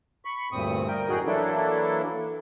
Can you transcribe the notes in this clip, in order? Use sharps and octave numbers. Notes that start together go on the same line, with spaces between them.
B5 C#6
D2 G2 A#2 C4 D#6
G3 A#4 G5
F#2 A2 D#4 F#4 G#4 G5
E3 F#3 A#3 D4 E4 A4